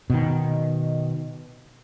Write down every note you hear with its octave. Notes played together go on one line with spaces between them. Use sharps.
B2 D#3